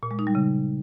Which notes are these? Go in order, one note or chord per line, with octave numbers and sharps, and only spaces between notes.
A#2
G#3
D#4
G3
C#3